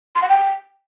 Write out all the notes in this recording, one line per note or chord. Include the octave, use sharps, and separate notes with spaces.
C6
F#5
G5